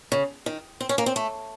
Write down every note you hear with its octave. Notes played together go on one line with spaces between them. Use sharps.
C#3
D#3
C4
C#4
A#3
C4
A3